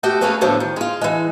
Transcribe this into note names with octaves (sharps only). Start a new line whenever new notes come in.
A3 B3 F#4 G4 G5
A3 A#3 C#4 F#4 G#4 B4
A2 D3 F3 F#3 B3
D#3
G#3 F4
E3 G#3